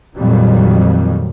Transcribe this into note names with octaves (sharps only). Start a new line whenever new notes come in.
F2 A#2 D#3 F#3 G3